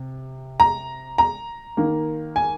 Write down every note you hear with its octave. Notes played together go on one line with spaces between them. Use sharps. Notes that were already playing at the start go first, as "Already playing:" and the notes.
Already playing: C3
A#5
A#5
D#3 A#3
G#5